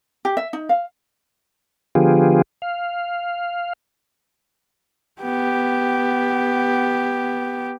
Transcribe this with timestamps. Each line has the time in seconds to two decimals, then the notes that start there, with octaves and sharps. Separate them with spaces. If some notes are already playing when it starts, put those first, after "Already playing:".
0.25 G4
0.37 E5
0.53 D#4
0.69 F5
1.95 D3 F3 B3 F4 G4 G#4
2.62 F5
5.22 B3 G4